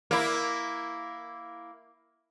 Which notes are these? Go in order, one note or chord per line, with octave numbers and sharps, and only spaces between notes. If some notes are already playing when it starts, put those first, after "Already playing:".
A#3 E4